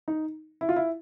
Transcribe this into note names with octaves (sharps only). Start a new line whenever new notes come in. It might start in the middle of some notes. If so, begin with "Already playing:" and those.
D#4
E4
F4
E4